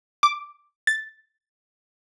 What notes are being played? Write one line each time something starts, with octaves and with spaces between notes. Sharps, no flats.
D6
A6